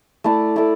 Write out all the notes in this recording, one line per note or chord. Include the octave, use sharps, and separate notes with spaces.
A3 E4 A4 D5
A3 E4 A4 D5